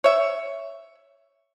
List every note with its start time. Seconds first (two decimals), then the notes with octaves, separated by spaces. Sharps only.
0.04 C#5 E5